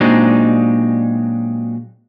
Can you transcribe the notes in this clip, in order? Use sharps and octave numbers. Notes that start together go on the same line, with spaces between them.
A#2 F#3 G#3 C4 D4 D#4